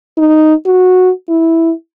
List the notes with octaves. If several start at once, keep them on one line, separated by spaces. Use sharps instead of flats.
D#4
F#4
E4